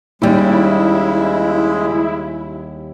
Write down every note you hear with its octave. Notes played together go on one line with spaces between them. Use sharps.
D#2 C#3 G3 G#3 E4